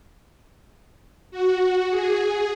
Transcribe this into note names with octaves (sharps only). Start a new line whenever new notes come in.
F#4
G#4